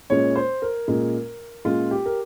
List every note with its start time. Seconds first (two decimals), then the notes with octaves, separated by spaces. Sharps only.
0.10 A#2 G#3 C#4 C#5
0.36 C5
0.62 A#4
0.88 A#2 G#3 C#4
1.65 A#2 G#3 C#4 F4
1.91 G4
2.06 A#4